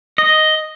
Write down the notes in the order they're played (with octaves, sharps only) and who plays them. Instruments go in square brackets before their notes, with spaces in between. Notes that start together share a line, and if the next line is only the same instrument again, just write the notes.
[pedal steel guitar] D#5